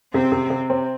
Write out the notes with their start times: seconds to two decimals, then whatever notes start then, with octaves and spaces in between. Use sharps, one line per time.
0.14 C3 C4
0.32 C3
0.50 C3
0.70 C4